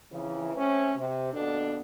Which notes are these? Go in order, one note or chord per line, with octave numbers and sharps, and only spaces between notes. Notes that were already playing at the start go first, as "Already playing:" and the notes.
F2 C#3 E3
A3 C4 C#4
C3
D#2 B2 B3 D4 A4